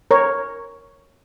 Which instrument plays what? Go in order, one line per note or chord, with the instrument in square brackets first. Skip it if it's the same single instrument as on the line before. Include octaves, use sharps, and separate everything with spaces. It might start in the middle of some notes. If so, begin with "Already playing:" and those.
[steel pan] A#4 C#5